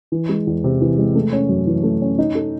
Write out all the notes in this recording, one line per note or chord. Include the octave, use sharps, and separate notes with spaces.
E3
G#3
E2
C3
E3
G#3
A3
C#4
F#2
E3
A3
C#4
D#4
A4